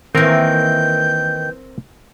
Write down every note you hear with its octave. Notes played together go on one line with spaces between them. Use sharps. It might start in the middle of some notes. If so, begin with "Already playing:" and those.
D#3 E3 A#3 C4 A#4 G6